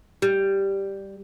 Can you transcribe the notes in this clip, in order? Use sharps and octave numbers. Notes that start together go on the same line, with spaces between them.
G3